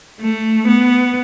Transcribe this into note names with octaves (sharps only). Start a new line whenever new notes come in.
A3
B3